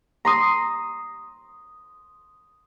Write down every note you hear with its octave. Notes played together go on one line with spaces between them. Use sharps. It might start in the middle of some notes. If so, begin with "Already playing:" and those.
A#5 C6 D#6